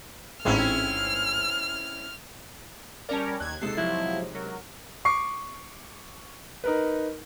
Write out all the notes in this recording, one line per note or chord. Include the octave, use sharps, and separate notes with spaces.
A1 G#2 C4 C#4 E4 F6
G3 C#4 A#4 D5 A5
D#2 F#6 G#6
C3 G#3 D#4 A4 C7
F3 F#3 E4
F#3 A#4
C#6 D6 C7
D#4 A#4 B4